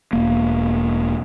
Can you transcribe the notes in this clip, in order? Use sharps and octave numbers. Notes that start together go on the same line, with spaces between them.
E1 A#3